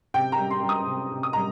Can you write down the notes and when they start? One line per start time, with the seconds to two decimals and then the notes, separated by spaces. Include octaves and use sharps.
0.14 C3 G5
0.32 A#5
0.38 G3
0.51 C6
0.63 G3
0.69 D#6
0.87 C3
1.11 C3
1.23 D#6
1.33 G3 A#5